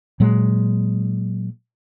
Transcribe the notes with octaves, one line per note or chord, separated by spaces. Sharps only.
A#2 F#3 G#3